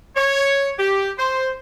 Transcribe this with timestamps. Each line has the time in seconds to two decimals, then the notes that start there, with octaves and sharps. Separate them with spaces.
0.16 C#5
0.79 G4
1.19 C5